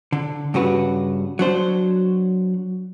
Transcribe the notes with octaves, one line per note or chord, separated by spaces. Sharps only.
D3
G2 C#3 F#4 B4
F#3 D4 C5